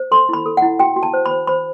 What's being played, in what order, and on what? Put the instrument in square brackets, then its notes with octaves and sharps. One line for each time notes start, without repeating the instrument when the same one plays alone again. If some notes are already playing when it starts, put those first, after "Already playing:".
Already playing: [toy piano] C5
A4 C6
E4 B5
A4
E4 F#5
F#4 G5
F#4
A5
C5
B5
C5
C5 B5